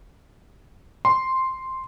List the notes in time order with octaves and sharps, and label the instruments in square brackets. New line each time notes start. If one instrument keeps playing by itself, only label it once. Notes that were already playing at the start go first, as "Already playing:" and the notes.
[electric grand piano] C6